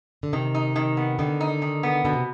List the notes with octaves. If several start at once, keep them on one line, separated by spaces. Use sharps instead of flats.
D3
C3 D#3
D#4
D#3
B3
D3 D#3
D#4
D#3
B3
B2 D3
C3